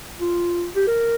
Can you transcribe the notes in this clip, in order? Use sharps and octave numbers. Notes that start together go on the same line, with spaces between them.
F4
G4
A#4